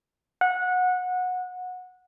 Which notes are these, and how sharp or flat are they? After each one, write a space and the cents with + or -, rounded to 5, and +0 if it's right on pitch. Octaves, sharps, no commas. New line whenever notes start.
F#5 -20